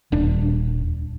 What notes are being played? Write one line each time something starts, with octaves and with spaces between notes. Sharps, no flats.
D#1 D4